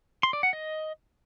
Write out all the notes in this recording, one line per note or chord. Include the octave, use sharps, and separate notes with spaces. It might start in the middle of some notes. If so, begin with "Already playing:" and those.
C6
D5
F#5
D#5